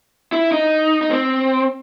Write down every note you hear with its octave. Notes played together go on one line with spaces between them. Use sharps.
E4
D#4
D#4
C4